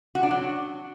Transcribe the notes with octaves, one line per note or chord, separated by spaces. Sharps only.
F#4
D4
F#3